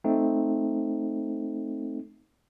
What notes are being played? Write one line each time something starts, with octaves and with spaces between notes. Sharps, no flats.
A3 C4 D#4